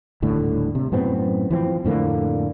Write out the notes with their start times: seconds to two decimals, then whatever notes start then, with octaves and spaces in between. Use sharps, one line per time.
0.22 D#1 A2 D3
0.75 C3
0.92 F#2 A2 B3 C4
1.51 E3 F3 C4
1.84 F2 A2 D3 A#3